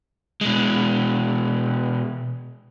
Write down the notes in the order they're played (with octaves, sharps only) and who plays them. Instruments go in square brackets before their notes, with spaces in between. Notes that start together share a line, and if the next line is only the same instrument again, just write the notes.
[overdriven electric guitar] B2 G#3